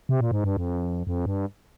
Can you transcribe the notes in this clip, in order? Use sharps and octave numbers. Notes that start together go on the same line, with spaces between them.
C3
A#2
G#2
G2
F2
F2
G2